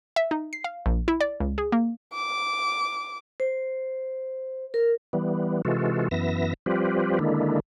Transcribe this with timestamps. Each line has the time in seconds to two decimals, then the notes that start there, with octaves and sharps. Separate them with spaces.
0.16 E5
0.31 D#4
0.53 C7
0.64 F5
0.86 A#1
1.08 E4
1.21 D5
1.40 C#2
1.58 G#4
1.72 A#3
2.14 D6
3.40 C5
4.74 A#4
5.13 E3 G3 B3
5.65 C3 E3 G#3 F4 F#4 A4
6.11 F#2 E3 B3 E5 A#6
6.66 F3 G3 C4 F4 G4 B4
7.19 D3 D#3 G#3 A#3 D4 E4